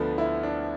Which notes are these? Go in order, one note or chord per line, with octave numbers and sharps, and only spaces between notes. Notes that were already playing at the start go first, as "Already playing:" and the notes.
Already playing: D2 D3 F3 A3 B3 D4
E4
D4